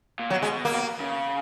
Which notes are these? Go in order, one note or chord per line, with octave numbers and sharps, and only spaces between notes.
A#2
B2 F#3
G#3
A#3
C#3